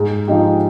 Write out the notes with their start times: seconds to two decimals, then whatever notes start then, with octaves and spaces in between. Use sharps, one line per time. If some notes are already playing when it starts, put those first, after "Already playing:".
Already playing: G#2
0.28 F3 G#3 D#4 G4